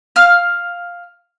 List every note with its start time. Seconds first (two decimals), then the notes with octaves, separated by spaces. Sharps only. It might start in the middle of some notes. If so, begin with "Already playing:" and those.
0.16 F5 F6